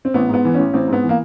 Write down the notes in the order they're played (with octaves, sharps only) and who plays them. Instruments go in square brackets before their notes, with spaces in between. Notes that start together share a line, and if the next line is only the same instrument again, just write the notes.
[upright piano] C4
A1 B3
G#2 B3
E3
A1 C#4
A1 C4
G#2 B3
E3
A#3